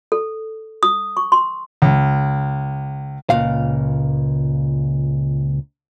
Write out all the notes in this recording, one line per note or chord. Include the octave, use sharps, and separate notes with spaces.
A4
D#6
C#6
C6
C#2
C#2 A#2 F5